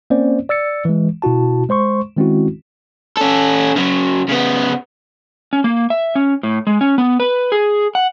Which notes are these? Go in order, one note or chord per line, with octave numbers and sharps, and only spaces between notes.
A#3 C4 C#4 C5 D5
D5 E6 A6 C#7
E3 G#3
B2 E4 F#4 A5
G#3 C5 C6 C#6
D#3 G#3 C4 C#4 E4 F#4
C#4 A4
C#3 F#3
C#3 B3
C#4
A#3
E5
C#4
A2
G#3
C#4
B3
B4
G#4
F#5